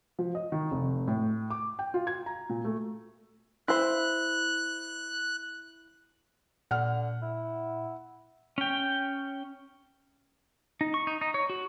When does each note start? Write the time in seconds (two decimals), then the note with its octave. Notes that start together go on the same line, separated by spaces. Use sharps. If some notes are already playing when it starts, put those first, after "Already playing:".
0.19 F3
0.35 D#5
0.52 D#3
0.71 F1
1.07 A2
1.50 D6
1.79 G5
1.94 F4
2.07 G#6
2.26 A#5
2.49 A#2
2.65 A3
3.68 E4 C5 F#6
6.71 A#2 D3 F#5 F6
7.22 E4
8.58 C#4 G5
10.81 D#4
10.94 C#6
11.07 D#4
11.21 D#4
11.34 C#5
11.50 F#4